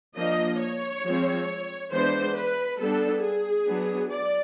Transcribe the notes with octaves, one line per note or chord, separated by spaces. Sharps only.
F3 A#3 D4 D#5
C#5
F3 G#3 C4
E3 G#3 B3 D4 C5
B4
G3 B3 D4 A4
G#4
F#3 B3 D4
D5